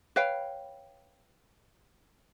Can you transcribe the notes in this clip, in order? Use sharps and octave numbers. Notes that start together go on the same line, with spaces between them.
B4 C#5 F5 G5